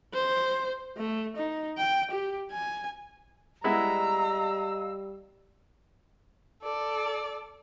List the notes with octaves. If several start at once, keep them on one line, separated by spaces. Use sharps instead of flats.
C5
A3
D#4
G5
G4
G#5
G3 G#3 B3 E4 D#5 F5 A#5 E6
A4 D5